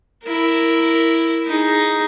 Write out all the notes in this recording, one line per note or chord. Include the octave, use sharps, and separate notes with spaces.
E4 A#4
D#4 G#4